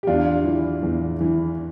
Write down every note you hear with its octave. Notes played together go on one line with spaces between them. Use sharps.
G4
E2 D4 F4
E3
E2
E3